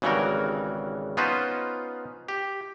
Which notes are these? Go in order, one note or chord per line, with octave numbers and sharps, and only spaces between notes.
G#1 C#3 E3 G3 F#4 A#4
B3 C#4 D#4 F4 B4 C5
G4